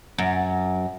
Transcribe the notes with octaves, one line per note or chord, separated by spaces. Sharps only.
F#2